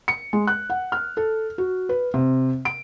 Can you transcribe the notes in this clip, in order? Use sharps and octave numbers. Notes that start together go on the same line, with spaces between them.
C#7
G#3
F#6
F#5
F6
A4
F#4
B4
C3
D7